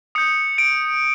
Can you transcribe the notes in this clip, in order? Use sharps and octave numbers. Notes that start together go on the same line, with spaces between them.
D#6 G6 C#7
D7